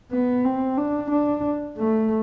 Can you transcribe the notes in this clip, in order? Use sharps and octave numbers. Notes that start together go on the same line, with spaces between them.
B3
C4
D4
D4
A3